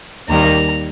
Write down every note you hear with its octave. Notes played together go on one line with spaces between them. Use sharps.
D#2 D#3 G3 A#3 A#5